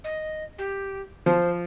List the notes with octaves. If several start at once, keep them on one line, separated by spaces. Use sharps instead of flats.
D#5
G4
F3 C5